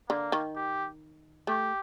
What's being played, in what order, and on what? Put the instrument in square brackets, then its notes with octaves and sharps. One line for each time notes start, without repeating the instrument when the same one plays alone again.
[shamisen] D3 [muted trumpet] A#3
[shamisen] D#3
[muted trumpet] G4
[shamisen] A3 [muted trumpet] G4